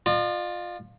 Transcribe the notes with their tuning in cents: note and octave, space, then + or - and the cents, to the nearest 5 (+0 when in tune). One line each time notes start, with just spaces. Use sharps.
F4 +15 D#5 -45